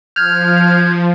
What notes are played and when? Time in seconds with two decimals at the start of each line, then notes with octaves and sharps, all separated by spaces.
0.16 F3 F6 G6 G#6